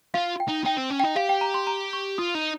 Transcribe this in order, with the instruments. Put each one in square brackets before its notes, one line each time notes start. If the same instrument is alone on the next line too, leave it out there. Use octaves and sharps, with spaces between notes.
[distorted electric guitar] F4 [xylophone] F5
[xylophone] G5
[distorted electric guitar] D#4
[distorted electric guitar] D#4 [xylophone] G5
[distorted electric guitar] C4
C#4
[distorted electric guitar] D#4 [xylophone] G5
[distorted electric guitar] G4 [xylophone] F5
[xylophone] G5
A#5
C6
A#5
C#6
[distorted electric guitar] F4 [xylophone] D#6
[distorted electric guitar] D#4